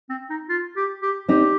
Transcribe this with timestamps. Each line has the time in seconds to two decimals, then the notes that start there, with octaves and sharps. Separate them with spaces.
0.10 C4
0.30 D#4
0.49 F4
0.76 G4
1.02 G4
1.29 C4 D#4 G4